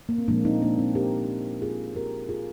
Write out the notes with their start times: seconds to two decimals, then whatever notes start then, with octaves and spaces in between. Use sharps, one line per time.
0.09 A#3
0.18 C4
0.28 A#2 F3 G#3 A#3 D4
0.45 C4 D#4
0.62 A#3 D4
0.79 C4
0.95 G4 A#4
1.62 F4 G#4
1.95 G4 A#4
2.29 F4 G#4